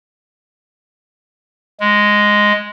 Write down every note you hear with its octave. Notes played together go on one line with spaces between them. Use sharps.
G#3